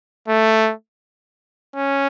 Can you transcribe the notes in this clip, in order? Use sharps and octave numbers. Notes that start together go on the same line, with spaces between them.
A3
C#4